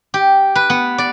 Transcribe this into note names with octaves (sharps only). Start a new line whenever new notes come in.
G4
B4
B3
D5